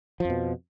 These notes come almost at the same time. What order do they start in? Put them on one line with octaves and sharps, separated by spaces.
F3 F2 B2